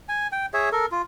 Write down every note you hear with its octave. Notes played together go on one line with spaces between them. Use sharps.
G#5
G5
G#4 C#5 E5
A4 A#4
F4